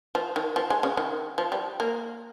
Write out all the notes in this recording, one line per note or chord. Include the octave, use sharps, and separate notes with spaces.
F3
D#3
F3
G#3
C#3
D#3
F3
G3
A#3